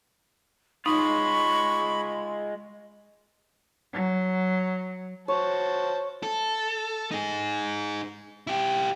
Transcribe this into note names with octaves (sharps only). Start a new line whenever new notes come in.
G#3 D#4 F4 B5 C#6
F#3
F#4 C5 C#5 A5
A4
D#4 G#4
E4 G4